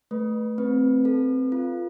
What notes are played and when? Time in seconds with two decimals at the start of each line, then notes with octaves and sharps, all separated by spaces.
0.11 A3 B4
0.58 C4 B4
1.05 A4
1.52 F4